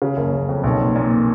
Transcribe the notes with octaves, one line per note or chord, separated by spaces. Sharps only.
C#3
F#1
F#1
F2
B1
A#2
A#2